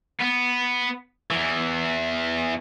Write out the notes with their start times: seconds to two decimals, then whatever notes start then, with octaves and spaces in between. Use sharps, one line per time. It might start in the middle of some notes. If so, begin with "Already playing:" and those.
0.20 B3
1.31 E2 E3